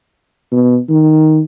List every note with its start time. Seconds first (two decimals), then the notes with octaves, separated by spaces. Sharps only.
0.52 B2
0.89 D#3